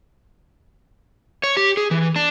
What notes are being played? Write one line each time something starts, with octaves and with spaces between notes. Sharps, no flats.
C#5
G4
G#4
E3
D4